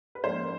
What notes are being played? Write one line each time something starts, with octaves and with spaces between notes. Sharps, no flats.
B4
G#2 F3 A#3 C#4 C5